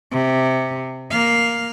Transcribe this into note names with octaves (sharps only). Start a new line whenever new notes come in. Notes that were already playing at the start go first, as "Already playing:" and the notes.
C3
A#3 F5